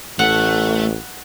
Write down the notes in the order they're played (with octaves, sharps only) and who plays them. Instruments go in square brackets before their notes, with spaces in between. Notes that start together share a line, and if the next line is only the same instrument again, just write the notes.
[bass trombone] A1 [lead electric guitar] A3 [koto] F#5